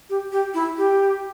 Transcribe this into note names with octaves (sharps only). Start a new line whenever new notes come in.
G4
G4
E4
G4